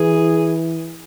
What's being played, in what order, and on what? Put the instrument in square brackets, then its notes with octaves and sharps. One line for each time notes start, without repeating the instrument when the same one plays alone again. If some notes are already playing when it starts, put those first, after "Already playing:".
Already playing: [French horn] E3 [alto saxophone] G#4